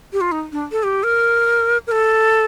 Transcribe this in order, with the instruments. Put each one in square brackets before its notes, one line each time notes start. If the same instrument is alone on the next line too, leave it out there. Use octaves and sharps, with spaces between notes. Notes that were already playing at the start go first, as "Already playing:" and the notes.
[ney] G4
F4
D#4
D4
A4
G4
A#4
A#4
A4